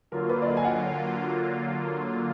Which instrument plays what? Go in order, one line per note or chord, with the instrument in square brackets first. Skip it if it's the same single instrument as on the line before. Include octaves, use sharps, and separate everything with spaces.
[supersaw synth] D3 F#3 A#3 F4 [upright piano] A#4
[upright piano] B4
D5
D#5
G#5
F#5